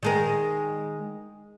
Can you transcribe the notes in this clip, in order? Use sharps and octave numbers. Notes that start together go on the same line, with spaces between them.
D#3 G#3 A#4